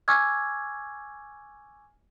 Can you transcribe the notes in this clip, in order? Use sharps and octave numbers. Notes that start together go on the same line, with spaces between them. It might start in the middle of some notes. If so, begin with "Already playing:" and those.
G#5 C#6 D6 E6 F6 G#6